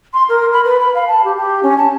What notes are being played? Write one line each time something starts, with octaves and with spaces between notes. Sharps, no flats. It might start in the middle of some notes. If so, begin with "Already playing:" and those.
C6
A#4
B5
B4
B5
F5
A5
G4
G4
C#4
A5